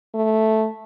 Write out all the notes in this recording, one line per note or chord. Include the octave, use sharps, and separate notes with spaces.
A3